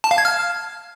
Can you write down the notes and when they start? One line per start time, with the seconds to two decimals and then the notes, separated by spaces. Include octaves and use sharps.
0.04 A5
0.11 F5
0.18 G#6
0.25 F6